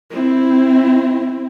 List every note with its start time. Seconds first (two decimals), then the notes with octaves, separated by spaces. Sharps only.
0.11 C4 E4